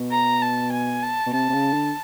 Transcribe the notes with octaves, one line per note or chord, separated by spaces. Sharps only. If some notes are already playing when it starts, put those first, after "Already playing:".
Already playing: B2
A#5
A5
G#5
A5
B2
C3 A5
C3
C#3
D3